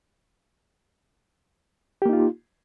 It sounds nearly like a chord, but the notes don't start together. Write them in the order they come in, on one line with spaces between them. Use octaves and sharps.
G4 A#3 D#4 F4